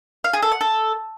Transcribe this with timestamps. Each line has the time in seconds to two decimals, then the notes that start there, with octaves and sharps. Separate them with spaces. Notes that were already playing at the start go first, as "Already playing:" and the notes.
0.24 F5
0.33 G#4
0.42 A4
0.52 F#5
0.61 A4